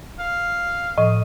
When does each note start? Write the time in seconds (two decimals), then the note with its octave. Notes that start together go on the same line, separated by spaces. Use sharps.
0.19 F5
0.98 A2 F3 D#5